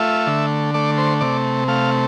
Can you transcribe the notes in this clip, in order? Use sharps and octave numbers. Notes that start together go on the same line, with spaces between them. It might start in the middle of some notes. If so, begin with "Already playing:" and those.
Already playing: A3 F4 E5
D3
A3 D5
C5
C3 D5
A3 F5